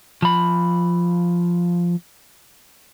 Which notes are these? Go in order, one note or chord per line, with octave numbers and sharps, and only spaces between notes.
F3 B5